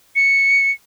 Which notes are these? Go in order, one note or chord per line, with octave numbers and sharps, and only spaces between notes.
C#7